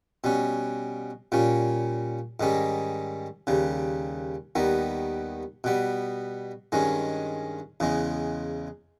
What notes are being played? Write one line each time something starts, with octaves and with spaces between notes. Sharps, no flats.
B2 G3 C#4
A#2 G3 C#4
G#2 D#3 G3 C#4
D#2 C#3 G3
D#2 D#3 G3 B3
B2 G3 B3
G2 D#3 G#3 C#4
E2 C#3 G#3